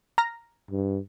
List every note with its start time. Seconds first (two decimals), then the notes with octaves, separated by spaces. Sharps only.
0.18 A#5 F6 A#6
0.71 G2